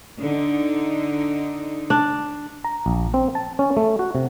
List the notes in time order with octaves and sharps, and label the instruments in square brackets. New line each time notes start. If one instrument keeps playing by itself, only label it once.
[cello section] D3 D#4
[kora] D4
[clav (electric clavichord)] A#5
A#1
C4
A5
C#4
A3
F#4
C3